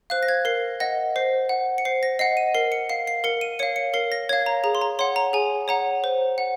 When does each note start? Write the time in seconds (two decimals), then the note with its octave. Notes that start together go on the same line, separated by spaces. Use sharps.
0.10 C5 F5 F#6
0.23 A#6
0.28 G#6
0.45 A#4 C7
0.80 D#5 F#5 A#6
1.16 C5 C7
1.49 F#5
1.78 C#7
1.85 C5 C7
2.03 A#6
2.19 D#5 F#5 C7
2.37 D#7
2.54 A#4 C7
2.72 C#7
2.89 F5 C7
3.07 C7
3.24 A#4 C#7
3.41 D#7
3.59 C#5 F5 C#7
3.76 C#7
3.94 A#4 C7
4.12 A#6
4.29 C#5 F5 G#6
4.46 A#5
4.64 G#4 A#5
4.75 C6
4.81 A#5
4.99 C#5 F#5 C6
5.16 A#5
5.33 G#4 G#5
5.68 C#5 F#5 A#5
6.04 C5
6.38 F#5